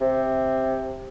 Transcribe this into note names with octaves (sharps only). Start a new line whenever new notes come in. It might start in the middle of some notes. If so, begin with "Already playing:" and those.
C3